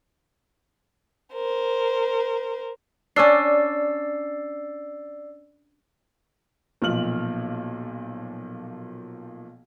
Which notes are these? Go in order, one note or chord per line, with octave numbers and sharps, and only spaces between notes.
A#4 C5
C#4 D4 D5 E6 C7
B1 A#2 F3 F6 F#7